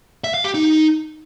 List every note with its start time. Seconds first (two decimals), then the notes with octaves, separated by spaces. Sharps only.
0.24 E5
0.34 F5
0.44 G4
0.54 D#4